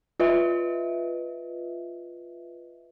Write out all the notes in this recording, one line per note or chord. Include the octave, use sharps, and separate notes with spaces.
F4 B4 D#5 E5